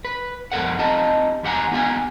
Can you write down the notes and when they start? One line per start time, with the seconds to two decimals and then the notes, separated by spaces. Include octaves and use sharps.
0.05 B4
0.52 F2 B2 A4 A#4 D5 F#5
0.79 C4 D#4 F4 G4 D#5 A5
1.43 E2 G4 F#5 G#5 A#5
1.72 B3 D#4 F4 G4 F5 G#5